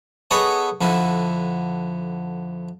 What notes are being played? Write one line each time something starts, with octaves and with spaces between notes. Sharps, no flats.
B3 G#4 A4 C#5 D#5
F2 D3 E4